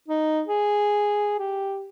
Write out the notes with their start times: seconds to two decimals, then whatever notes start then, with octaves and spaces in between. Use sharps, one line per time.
0.08 D#4
0.47 G#4
1.39 G4